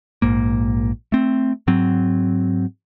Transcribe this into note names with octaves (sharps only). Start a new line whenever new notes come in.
A#1 G#2 A#3
A3 C4
G#2 F#3 C4